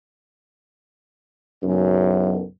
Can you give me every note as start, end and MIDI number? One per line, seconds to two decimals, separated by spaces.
1.63 2.42 30
1.63 2.42 35
1.63 2.42 42